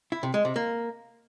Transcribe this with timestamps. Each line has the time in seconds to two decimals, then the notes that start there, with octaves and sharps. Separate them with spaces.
0.12 E4
0.23 C3
0.34 G#3
0.45 C3
0.56 A#3